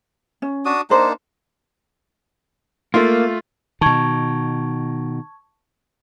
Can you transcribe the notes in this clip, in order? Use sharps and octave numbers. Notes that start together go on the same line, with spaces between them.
C#4
D4 F#4 D#6
A#3 D4 D#4 A#4 C5
A3 A#3 F4
B2 D#3 A5 C#6 G#6